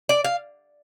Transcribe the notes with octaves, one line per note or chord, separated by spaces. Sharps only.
D5
F5